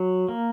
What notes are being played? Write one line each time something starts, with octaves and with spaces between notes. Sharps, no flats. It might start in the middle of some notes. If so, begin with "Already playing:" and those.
Already playing: F#3
A#3